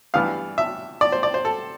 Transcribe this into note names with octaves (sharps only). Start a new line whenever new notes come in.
G2 E3 G3 B3 D4 F5
E5
D5
C5
D5
C5
A4